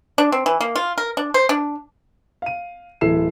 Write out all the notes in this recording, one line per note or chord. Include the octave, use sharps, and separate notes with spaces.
D4
C4
E3
A#3
F4
A#4
D4
C5
D4
F5 D#7
D1 E3 E4 A4 C7 E7